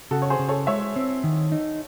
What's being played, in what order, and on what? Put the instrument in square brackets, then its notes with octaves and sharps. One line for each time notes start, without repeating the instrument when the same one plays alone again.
[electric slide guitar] C#3 [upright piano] F#4 A4
[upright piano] C#5
G#4 C5
[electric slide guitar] C#3
[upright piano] A4 C#5
[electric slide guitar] G#3 [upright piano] C#5 E5
[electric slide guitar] C4
D#3
D#4